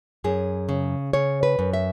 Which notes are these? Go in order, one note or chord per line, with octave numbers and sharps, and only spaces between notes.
F#2 G#4
C#3
C#3 C#5
B4
F#2
E5